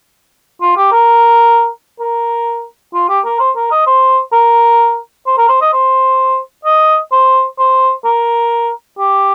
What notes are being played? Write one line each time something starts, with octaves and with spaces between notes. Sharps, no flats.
F4
G4
A#4
A#4
F4
G4
A#4
C5
A#4
D#5
C5
A#4
C5
A#4
C5
D#5
C5
D#5
C5
C5
A#4
G4